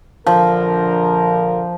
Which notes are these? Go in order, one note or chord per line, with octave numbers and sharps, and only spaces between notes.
A#1 D3 F3 A#4